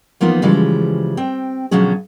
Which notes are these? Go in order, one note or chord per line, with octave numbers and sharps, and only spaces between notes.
E3 F3 A#3 B3 D#4 F4
C#3 E3 F3 G3 G#3
C4 G5
B2 D3 F3 F#3 C#4 G#4